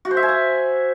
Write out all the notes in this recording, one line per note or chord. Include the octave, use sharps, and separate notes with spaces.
F#4
C5
E5
G#5
F#5